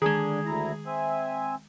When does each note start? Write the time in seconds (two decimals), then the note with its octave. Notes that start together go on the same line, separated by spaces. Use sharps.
0.02 D3 D#3 G#3 D4 G#4
0.45 D2 E4 A#5
0.86 C4 E5 G#5